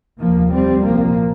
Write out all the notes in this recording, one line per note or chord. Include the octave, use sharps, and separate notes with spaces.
F1 D#2 F3 A#3
G3 C4
C2 A#2 F3 A#3